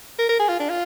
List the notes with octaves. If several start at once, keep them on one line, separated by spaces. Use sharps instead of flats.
A#4
A#4
G#4
F4
D4
F4